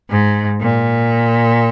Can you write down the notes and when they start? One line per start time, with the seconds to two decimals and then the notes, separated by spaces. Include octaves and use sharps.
0.10 G#2
0.61 A#2